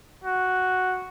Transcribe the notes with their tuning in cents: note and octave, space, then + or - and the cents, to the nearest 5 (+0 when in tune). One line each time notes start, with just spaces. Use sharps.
F#4 +0